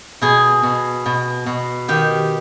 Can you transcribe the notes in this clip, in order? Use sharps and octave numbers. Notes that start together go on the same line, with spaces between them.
B2 G#4
B2
B2
B2
D#3 G4